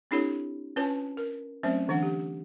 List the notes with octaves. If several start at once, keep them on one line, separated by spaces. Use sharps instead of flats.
C4 D4 E4 G4 A4 C#5
C#4 F4 B4 C#5 G#5 A5
A#4
F#3 A3 C4 C#4 C5 E5
D3 E3 D4 F#5
G4